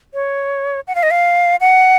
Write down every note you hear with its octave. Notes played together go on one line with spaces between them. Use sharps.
C#5
F#5
F5
D#5
F5
F#5